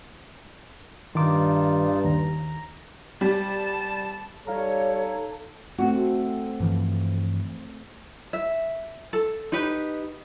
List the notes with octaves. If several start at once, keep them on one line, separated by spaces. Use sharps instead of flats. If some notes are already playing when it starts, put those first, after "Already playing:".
G2 D#3 D#4 F4 A5 D6
D#2 A#5
G3 A5
G3 D#4 A4 C#5 F5 A#5
A3 C4 F#4
G2 E3 F3
E5
A4 A5
D#4 G4 B4